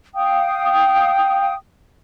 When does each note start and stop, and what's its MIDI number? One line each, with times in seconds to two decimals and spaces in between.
0.15 1.54 77
0.15 1.54 79
0.15 1.54 87